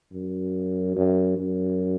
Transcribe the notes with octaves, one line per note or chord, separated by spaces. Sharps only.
F#2
F#2
F#2